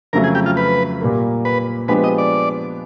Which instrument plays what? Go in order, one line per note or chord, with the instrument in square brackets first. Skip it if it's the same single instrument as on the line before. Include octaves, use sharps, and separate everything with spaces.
[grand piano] F2 C#3 F#3 A3 [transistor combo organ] A#4
[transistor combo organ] G#4
G4
F4
B4
[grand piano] A#2 G3 A#3
[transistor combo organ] B4
[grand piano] F3 G#3 B3 D4 G4 [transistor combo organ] B4
[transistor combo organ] D#5
D5